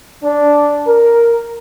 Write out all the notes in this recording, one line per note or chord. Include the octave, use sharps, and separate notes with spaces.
D4
A#4